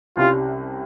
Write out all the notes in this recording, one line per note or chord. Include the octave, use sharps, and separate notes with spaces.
C2 C3 G3 C#4 F4 G4